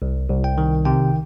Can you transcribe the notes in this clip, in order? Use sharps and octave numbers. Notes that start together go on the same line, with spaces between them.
C2
C2
G5
D#3
C3 G5